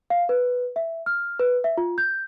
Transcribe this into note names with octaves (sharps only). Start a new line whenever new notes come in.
F5
B4
E5
F6
B4
E5
F4
G6